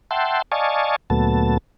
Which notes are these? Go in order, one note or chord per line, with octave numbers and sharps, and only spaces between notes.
E5 F#5 G5 A5 C6
D5 D#5 F5 G#5 A5 C#6
D2 A#2 F#3 A3 B3 A5